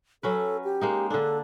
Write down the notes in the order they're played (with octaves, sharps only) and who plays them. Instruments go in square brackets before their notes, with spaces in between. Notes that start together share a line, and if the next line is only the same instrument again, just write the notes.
[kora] F#3 C#4 B4 [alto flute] A4
[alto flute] G4
[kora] G#3 A#3 D#4
[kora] D3 D4 [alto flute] A4